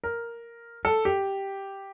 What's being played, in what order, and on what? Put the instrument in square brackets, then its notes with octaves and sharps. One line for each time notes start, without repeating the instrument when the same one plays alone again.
[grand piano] A#4
A4
G4